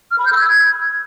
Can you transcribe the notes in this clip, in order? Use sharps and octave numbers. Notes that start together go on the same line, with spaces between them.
F6
B5
G6
E6
G#6